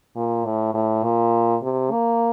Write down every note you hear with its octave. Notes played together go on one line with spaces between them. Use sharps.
A#2
A2
A2
A#2
C3
A#3